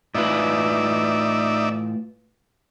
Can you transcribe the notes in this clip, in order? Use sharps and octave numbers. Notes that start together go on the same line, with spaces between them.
A2 D#4 F4 B4 D5 E5